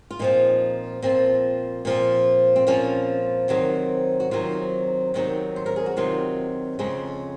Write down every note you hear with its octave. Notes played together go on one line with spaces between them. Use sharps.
F4
A#2 F3 C4 D#4
A#2 F3 C4
A#2 F3 C4
C4
A#2 F3 C4 C#4
C3 D#3 F#3 C4
F#4
C3 D#3 F#3 C4 F4
C3 D#3 F#3 C4
C5
A#4
G#4
F#4
C3 D#3 F#3 C4 F4
F2 C#3 G#3 C4